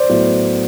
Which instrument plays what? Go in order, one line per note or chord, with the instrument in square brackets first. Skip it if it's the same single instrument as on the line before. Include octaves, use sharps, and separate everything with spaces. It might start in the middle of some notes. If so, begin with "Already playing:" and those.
Already playing: [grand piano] C5 D5
A2 F#3 B3 E4